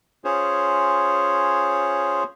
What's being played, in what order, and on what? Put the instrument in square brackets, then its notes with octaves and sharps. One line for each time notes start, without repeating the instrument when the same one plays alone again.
[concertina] C#4 F4 G#4 C5 C#5